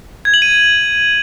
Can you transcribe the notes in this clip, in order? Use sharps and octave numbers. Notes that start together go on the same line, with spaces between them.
G#6
F#7
D#7